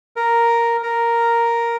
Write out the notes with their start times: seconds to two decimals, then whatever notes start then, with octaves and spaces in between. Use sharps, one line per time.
0.16 A#4
0.83 A#4